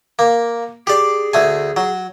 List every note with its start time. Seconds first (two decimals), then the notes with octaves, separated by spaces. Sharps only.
0.19 A#3
0.87 G4 G#4 D5
1.34 D2 A3 G#5
1.77 F#3